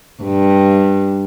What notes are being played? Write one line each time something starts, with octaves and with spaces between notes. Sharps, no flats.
G2